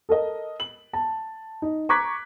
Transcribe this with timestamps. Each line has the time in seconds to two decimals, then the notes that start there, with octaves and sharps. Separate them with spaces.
0.09 A4 A#4 D#5
0.60 F#7
0.93 A5
1.62 D#4
1.89 A#5 C#6 D6 F#6 G#6 B6